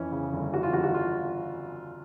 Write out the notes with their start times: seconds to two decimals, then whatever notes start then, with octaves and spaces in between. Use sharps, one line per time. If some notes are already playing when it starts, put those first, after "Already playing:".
Already playing: F2 E3 C#4
0.12 C#3
0.33 G1
0.53 E3 F#4
0.63 F4
0.73 G1 F#4
0.84 F#4
0.94 F4